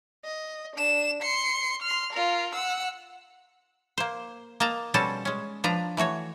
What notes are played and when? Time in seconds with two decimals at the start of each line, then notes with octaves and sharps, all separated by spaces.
0.25 D#5
0.76 D4 E7
1.22 C6 C#7
1.82 C6 F6
2.13 F4 A#4
2.55 F#5 E6
3.98 A#3 C5
4.60 A#3 D#5 A5 A#5
4.94 B2 G3 C4 C#4 A4 A5
5.25 G#3 C#4
5.64 F3 D4 B4 A#5
5.97 E3 A3 F#4 C#5